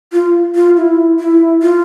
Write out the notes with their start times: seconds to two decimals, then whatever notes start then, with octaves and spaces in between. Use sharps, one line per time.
0.13 F4
0.55 F4
0.77 E4
1.20 E4
1.62 F4